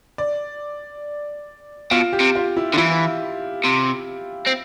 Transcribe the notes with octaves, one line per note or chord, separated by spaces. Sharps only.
D5
B2 F4
G4
C3
F4
E4
D3
E3 E4
C3
C4